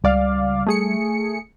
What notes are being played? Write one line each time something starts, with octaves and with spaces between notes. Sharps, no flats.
C#2 G3 D5 F5
A3 G#4 C#7